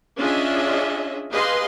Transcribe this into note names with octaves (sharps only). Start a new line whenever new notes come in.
C#4 D4 F4 G#4 D#5 E5
G4 G#4 B4 D#5 F5 C6